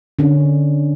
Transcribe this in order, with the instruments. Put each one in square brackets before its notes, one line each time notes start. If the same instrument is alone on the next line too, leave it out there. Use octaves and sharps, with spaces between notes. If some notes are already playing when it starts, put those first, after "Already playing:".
[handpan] D3 C#4